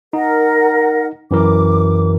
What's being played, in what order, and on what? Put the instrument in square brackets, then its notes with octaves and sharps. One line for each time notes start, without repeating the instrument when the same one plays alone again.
[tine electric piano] D#4 [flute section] A#4 F#5
[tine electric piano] F#2 E3 A#4 [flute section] D6